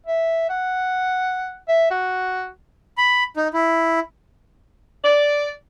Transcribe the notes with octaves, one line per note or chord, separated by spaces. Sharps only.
E5
F#5
E5
F#4
B5
D#4
E4
D5